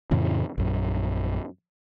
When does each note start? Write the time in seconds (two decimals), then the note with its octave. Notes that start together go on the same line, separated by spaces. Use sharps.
0.11 F2 A2 C#3 E3
0.58 A#1 F#2